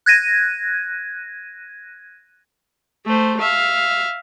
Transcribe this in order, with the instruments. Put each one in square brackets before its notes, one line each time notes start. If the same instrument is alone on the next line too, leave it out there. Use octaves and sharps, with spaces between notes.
[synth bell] F#6 G#6 A#6 D#7
[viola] A3 C5
E5 F5